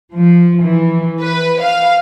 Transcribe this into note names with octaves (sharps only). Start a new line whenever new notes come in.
F3
E3
B4
F5